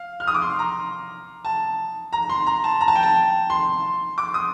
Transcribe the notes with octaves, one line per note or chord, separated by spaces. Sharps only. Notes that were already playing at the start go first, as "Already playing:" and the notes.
Already playing: F5
F6
D#6
D6
C6
A#5
A5
A#5
C6
A#5
A5
A#5
A5
G5
A5
C6
D6
D#6